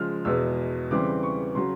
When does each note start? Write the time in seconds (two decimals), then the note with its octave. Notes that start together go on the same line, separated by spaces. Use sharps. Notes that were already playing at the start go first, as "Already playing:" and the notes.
Already playing: C#3 F3 G#3 F6
0.25 E2 B2 G#3 B3 E6
0.91 C#3 E3 G3 C4 D6
1.23 C#6
1.55 C#3 F#3 C6